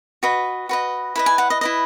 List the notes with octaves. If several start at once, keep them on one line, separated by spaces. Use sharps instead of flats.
F#4 B4 D#5
F#4 B4 D#5
E4 B4 D#5 B5
G#5
F#5
D#5
E4 B4 D#5